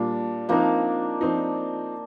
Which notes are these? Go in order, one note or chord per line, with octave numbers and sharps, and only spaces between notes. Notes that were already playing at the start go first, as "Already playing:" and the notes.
Already playing: A#2 G3 A#3 D4
F3 A#3 C4 D4 D#4
F3 C4 D#4